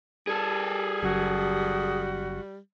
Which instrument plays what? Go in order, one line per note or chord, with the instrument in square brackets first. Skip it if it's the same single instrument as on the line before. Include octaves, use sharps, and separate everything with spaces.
[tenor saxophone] G3 [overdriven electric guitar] G#4 A4
[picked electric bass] F#1 F#2 [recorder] F#4